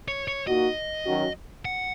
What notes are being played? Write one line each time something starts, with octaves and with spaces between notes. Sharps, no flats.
C#5
C#5
A#2 A#3 D#4 F#4 D#5
D#3 F#3 C#4 F#4
F#5